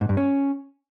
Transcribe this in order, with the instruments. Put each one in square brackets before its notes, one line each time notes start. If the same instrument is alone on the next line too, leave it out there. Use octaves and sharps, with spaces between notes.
[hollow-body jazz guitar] G#2
G2
C#4